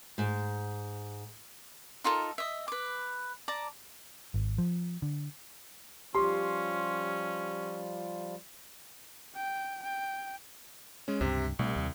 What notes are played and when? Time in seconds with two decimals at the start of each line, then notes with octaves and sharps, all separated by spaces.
0.18 G#2
2.04 D#4 F4 A4 A#4
2.38 D#5 E5
2.68 B4 D6
3.48 D5 A5 A#5
4.34 G#1
4.58 F3
5.02 D3
6.15 F3 G3 C#4 F4 G4 C6
9.36 G5
9.84 G5
11.08 G#3 C#4
11.21 C#2 G2 C3
11.59 C2 B2 A3
11.76 D#2 C3